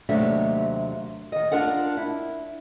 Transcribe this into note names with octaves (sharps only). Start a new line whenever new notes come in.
D#2 C3 F#3 A3 D4 E5
D#3 D#5
D4 F4 A#4 F#5
E4